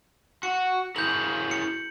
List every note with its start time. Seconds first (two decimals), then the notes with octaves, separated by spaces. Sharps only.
0.43 F#4 C#7
0.96 E4 G#4 A#4 G6 F#7
1.51 C#7